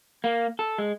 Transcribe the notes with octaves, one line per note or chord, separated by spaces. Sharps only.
A#3
A4
G#3